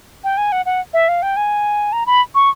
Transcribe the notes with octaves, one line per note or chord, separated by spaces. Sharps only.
G5
G#5
F#5
F#5
E5
F5
G5
G#5
A#5
B5
C#6